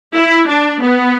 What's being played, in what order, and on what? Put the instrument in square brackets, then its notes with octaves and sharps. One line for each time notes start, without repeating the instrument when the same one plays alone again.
[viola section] E4
D4
B3